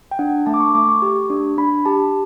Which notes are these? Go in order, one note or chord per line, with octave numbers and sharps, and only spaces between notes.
G5
D4 F#5
A3 A5
D6
C#6
A3 D6
C#6
G4
D4
D4 B5
G4 A5